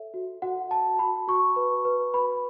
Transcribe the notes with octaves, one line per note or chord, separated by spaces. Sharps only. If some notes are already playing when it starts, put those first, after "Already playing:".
Already playing: A4 C#5 E5
F#4
F#4 F#5
F#4 A5
F#4 B5
F#4 C#6
B4
B4
B4 B5